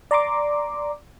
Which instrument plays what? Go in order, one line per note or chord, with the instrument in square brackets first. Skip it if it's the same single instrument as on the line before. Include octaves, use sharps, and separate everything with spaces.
[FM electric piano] D5 A#5 C6 D6